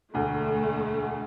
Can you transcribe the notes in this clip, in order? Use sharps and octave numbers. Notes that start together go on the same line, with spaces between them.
E1 D2 D3 A3